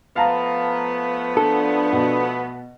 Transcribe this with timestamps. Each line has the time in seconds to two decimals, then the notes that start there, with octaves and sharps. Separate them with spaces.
0.16 F3 A3 B3 F5 A5 A#5
1.37 D4 A4
1.93 B2 F#4